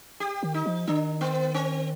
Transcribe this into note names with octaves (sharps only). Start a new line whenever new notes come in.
G4
D#3
D#4
F3
D#3 D4
B3
C4